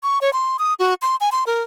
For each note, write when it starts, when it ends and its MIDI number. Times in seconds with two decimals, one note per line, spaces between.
0.03 0.19 85
0.21 0.32 73
0.33 0.57 84
0.59 0.74 87
0.79 0.94 66
1.02 1.16 84
1.21 1.29 80
1.32 1.44 84
1.47 1.62 70